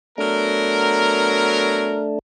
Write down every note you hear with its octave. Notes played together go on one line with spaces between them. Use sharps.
F#3 A3 B3 D4 A#4